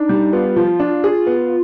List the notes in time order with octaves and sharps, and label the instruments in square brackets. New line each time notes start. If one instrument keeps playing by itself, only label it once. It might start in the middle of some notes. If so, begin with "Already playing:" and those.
Already playing: [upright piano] D4 [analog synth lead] D#4
[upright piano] G3
[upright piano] B3 [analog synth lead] F4
[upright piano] F3
D4
G#4
B3